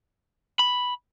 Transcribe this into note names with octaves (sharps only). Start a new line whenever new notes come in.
B5